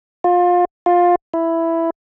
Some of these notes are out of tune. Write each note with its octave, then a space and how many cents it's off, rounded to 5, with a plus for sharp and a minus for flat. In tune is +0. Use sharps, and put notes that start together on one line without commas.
F4 +25
F4 +15
E4 +5